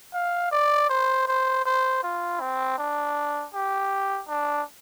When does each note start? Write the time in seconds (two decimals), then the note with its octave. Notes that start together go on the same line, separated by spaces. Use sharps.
0.14 F5
0.52 D5
0.90 C5
1.28 C5
1.65 C5
2.03 F4
2.41 C4
2.78 D4
3.54 G4
4.29 D4